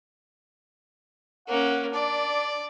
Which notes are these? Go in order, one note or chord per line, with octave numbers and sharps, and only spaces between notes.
A#3 C#4 F#5
D4 D5